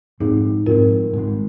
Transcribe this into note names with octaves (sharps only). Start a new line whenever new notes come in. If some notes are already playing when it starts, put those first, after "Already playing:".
G#2 F3 C4 D#4 G#4
G#2 F3 C4 F4 A#4
G#2 D#3 G#3